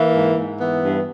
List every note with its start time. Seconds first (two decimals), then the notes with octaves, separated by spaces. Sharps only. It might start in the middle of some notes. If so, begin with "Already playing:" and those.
Already playing: E3 A#3
0.15 G#2
0.37 G#2
0.59 E3 B3
0.81 G2